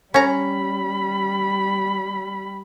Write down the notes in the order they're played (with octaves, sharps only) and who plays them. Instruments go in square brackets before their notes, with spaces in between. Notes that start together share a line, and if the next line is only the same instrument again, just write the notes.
[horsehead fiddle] G3 B5 [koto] C#4 A#5